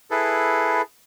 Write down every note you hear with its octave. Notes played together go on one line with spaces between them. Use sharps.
E4 G#4 A4 B4